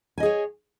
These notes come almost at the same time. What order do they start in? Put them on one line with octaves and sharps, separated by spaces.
G#5 D#5 G#4 C#5